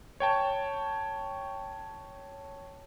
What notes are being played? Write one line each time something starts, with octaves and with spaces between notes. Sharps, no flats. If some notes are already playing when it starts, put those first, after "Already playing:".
C#5 G5 A5